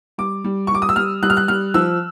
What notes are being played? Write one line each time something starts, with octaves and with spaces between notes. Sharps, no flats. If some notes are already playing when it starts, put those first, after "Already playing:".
G3 D6
G3
C#6
G3 D6
D#6
E6
G3 F6
G3 F#6
F6
F#6
G3 F6
F3 E6